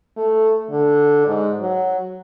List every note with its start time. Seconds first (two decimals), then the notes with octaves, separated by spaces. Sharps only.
0.17 A3
0.70 D3
1.27 G#2
1.61 F#3